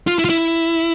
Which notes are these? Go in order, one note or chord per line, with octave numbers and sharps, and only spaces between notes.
F4
E4
F4
E4